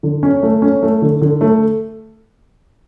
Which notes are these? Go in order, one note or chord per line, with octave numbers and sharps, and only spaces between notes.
D3
C#4
A3
C#4
A3
D3
D3
A3